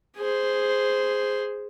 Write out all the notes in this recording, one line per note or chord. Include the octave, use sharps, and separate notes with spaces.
G#4 C5